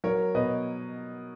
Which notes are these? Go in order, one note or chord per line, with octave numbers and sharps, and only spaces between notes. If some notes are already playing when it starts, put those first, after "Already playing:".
F#3 A#4 C#5
B2 B4 D#5